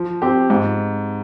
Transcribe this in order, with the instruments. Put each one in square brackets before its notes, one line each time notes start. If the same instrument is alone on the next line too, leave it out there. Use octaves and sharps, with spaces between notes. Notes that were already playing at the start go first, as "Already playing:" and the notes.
Already playing: [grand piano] F3
C4 G4
G#2